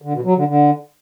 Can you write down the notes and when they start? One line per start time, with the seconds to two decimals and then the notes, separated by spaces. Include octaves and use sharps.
0.02 D3
0.13 B2
0.24 F#3
0.36 D3
0.47 D3